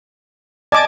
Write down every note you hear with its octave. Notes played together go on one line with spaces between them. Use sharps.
D5 D#5 G#5 A5 D6